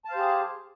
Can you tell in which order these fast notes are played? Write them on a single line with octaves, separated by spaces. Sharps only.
A5 F5 C5 G4 G#4